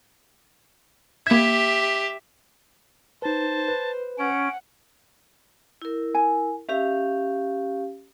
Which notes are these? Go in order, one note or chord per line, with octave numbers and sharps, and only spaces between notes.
A#3 G4 E5 G#6
D#4 B4 C5 A5
B4
C#4 F#5 D7
E4 A#4
G#5
C#4 G4 E5 F5